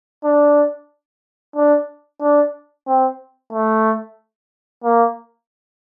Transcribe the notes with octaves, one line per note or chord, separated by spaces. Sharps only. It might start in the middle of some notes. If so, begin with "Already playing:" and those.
D4
D4
D4
C4
A3
A#3